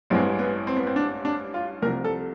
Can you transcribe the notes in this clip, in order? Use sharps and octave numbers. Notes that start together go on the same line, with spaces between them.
A1 G2 E3 G#3 C4
B3
C4
B3
C4
D4
D4
F4
C2 C3 F3 A#4
A4